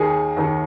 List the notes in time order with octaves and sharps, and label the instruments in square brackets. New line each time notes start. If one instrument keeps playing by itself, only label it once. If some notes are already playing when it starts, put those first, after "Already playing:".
Already playing: [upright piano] D#2 D#3 G#4
D#2 D#3